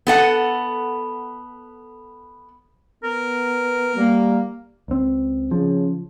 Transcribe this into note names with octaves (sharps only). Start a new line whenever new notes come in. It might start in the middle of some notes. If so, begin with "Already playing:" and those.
B3 A4 F#5
B3 A#4
G3 A#3
C#2 C4
C#3 F3